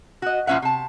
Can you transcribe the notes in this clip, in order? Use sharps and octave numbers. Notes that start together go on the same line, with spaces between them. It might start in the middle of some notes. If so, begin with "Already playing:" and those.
F#4 D#5
A#2 F3 C#4 E5 F#5
C3 A5